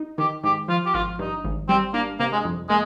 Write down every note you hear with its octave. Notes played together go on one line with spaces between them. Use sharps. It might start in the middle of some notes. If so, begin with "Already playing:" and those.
Already playing: D#4
D#3 G4
G#2 G4
F3 F4
G4
G#1 F4
G2 D#4
G#1
G3 C4
A#3 D4
C3 A#3
G#3
F2
G#3 A#3